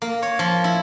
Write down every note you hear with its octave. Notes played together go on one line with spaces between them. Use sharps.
A#3
C#5
F3
E4